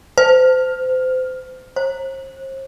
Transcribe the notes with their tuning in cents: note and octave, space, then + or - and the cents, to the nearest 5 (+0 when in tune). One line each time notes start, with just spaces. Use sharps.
C5 -30
C5 +40